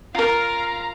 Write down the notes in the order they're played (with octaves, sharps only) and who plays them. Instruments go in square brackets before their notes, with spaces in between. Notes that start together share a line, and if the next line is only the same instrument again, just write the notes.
[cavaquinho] F4 A#4 [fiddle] F5 A#5